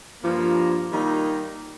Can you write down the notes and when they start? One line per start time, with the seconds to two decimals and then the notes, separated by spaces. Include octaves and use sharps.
0.23 G2 F3 A#3
0.90 D#3 G3 A#3 D#4